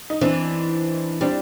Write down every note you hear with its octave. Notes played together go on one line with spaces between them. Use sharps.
D#4
E3 C4 D4
G3 C4 D4